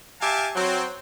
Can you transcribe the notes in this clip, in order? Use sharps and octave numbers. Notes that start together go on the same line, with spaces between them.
G4 E5 F5 G#5 A5
F#3 C4